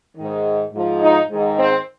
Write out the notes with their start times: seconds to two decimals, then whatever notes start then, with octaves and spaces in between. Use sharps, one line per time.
0.16 G#2 D#3
0.73 G#2 F3
1.01 D#4
1.30 G#2 D#3
1.58 C4